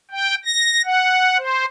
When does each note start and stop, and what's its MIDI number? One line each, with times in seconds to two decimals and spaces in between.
0.11 0.35 79
0.45 0.82 94
0.85 1.38 78
1.38 1.65 72